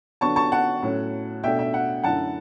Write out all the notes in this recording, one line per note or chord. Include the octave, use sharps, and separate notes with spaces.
D3 F#3 B3 D4 A5 C#6
A5 C#6
F#5 A5
A2 F#3 C#4
B2 A3 D4 E5 G5
E5
F#5
F#2 D3 A3 E4 F#5 A5